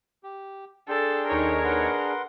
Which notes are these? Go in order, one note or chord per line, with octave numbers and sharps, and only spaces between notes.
G4
D4 G#4 A4 G5 C6
D#2 D#4 A#4 C#5
B4 F#5 C6